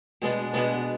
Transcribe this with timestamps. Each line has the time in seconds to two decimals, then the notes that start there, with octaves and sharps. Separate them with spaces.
0.22 B2 G#3 B3 D4
0.54 B2 G#3 B3 D4